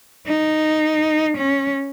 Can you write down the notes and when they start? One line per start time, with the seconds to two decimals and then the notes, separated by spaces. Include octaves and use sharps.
0.27 D#4
1.38 C#4